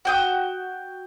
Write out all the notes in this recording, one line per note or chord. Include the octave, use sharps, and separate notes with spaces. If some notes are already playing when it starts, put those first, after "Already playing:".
F#4 G5 D#6